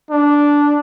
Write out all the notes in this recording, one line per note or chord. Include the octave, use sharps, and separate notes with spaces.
D4